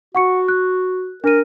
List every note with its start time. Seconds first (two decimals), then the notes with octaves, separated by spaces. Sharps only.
0.15 F#4 F#5 C#6 C#7
0.48 F#6
1.24 D4 A#4 D#7